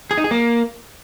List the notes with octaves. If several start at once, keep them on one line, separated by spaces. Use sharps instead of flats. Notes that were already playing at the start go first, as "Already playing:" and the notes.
G#4
D#4
G#4
A#3